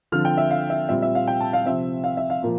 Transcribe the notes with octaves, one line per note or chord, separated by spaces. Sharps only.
D3 F3 C4 F6
G5
E5
F5
E5
A#2 G3 C4 E5
E5
F5
G5
A5
F5
C3 F3 C4 E5
F5
E5
F5
A#2 F3 A#3